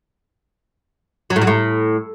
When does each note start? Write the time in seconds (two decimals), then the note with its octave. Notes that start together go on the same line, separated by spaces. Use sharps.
1.30 F#3
1.36 A2
1.42 F#3
1.47 A2